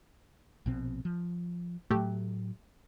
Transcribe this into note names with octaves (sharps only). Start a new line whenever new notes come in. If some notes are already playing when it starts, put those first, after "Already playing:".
A#1 B2 C4
F3
A2 F#3 A3 G4